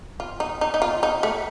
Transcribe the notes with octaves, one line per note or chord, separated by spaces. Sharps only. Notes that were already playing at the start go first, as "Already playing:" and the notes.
F4
D#4
D#4
D#4
F4
D#4
A3